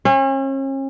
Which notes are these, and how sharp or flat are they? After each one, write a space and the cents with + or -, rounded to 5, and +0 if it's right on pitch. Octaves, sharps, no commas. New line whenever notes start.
C#4 -40 F5 -45